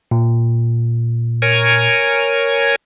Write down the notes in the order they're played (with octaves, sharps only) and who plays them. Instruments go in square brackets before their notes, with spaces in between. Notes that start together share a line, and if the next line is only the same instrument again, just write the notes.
[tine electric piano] A#2
[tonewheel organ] A#4 C#5 G#5